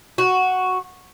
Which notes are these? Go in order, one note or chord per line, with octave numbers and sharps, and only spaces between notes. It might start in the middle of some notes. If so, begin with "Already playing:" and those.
F#4